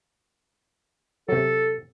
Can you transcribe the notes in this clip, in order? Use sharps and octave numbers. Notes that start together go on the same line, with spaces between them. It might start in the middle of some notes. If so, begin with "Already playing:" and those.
C3 F#3 A4